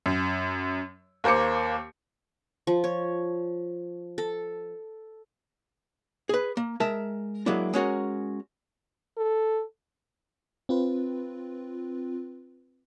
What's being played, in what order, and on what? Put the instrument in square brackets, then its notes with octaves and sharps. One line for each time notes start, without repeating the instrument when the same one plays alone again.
[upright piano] F#2
D#2 A#3 C5 D6 C#7
[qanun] F3
C#5
A4
[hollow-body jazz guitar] G#4 B4
A#3
G#3 A#4 E5 A5
F#3 G#3 A#3 D4 E4
G#3 C#4 F#4 A#4
[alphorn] A4
[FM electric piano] C4 F4 B4